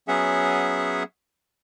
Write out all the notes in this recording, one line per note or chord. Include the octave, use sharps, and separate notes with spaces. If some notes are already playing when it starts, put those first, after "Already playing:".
F#3 B3 C#4 G#4 E5 F#5